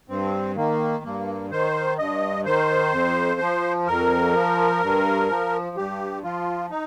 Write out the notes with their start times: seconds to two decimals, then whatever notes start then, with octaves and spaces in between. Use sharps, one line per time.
0.09 G2 C4
0.56 D#3 A#3
1.04 G2 A#3
1.50 D#3 C5
1.98 G2 D#5
2.45 D#3 C5
2.92 F2
3.40 F3
3.87 F2 A#4
4.34 F3
4.82 G2
5.29 F3
5.76 G2 G4
6.24 F3 F4
6.71 D#4